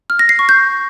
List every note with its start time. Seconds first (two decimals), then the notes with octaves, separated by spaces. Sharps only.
0.10 F6
0.19 A#6
0.29 C7
0.39 C#6
0.49 G6